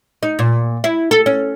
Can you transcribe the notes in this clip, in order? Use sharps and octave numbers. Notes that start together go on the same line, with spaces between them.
D#4
A#2
E4
A4
C#4